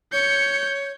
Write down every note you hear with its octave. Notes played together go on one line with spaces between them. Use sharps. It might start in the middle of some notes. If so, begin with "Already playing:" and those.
C#5 G6 C#7